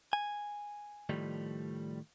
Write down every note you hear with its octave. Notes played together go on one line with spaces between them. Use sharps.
G#5
A2 D#3 F3 G3 A3